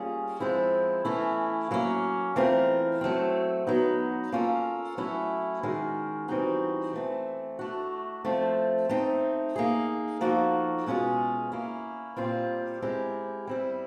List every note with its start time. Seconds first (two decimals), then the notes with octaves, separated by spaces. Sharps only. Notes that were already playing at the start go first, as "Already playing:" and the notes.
Already playing: G3 A#3 C#4 F4 G#4
0.40 F3 G#3 C4 E4
1.05 E3 A3 C#4 E4
1.71 F#3 A#3 C#4
2.36 E3 A3 C4 F4 A#4
3.01 F#3 A3 C4
3.67 F#3 B3 D#4
4.32 A#3 C#4 F4 A4
4.97 F#3 A3 C#4 E4
5.63 D#3 G#3 C#4 F#4 A#4
6.28 E3 G3 C4 D#4 F#4
6.93 E3 A3 C4
7.59 A3 D4 F#4
8.25 F3 A3 C4
8.89 A3 C4 D#4
9.56 A#3 D#4 G#4
10.21 F3 A#3 D#4 F#4 A4
10.86 B2 G#3 C#4 F4 G#4
11.52 A#3 C#4 E4
12.16 A#2 G3 C4 F4
12.82 G#3 C4 E4 G4 A#4
13.47 G3 C4 E4